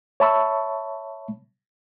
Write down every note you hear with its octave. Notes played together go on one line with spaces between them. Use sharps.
C#5 E5 A5 B5 C#6 E6